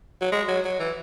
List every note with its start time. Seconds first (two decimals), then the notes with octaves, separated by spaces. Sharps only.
0.21 F#3
0.32 G#3
0.48 F#3
0.64 F#3
0.80 E3